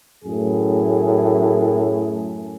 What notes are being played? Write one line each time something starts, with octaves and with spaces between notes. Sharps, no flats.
F#2 A2 G#4